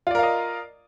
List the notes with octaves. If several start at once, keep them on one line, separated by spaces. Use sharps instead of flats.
F4 A#4 D5 D#5 F5